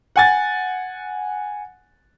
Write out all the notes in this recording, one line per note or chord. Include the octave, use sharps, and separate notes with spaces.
F#5 G#5 A6